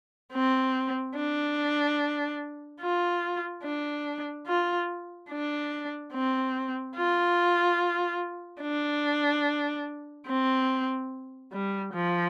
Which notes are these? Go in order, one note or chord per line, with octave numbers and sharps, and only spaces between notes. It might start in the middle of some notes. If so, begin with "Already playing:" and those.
C4
D4
F4
D4
F4
D4
C4
F4
D4
C4
G3
F3